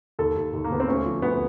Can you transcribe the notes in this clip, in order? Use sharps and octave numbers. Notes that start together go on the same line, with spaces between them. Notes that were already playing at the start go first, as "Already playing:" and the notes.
D#2 A4
D#2
D#2
A#3
D#2 B3
C4
D2 C#4
F3
D2 B3